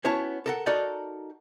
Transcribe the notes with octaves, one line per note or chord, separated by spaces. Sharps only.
B3 C#4 E4 F#4 C#5 A5
A4 A#4 F#5
D#4 F#4 A4 A#4 D5 D#5